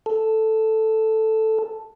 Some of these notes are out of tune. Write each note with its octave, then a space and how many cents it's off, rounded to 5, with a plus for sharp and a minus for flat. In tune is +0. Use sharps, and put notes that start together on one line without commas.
A4 +0